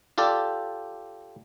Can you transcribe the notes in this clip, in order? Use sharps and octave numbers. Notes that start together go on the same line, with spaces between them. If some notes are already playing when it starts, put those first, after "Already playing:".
F4 G4 A4 D5